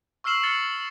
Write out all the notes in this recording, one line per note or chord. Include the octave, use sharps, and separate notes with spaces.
C#6 E6 F6 C7 E7 F#7
F6 A6 C#7